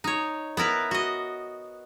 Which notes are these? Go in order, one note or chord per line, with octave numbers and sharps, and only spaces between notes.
D#4 C#5
B3 E4 A#4 B4
F#4 D#5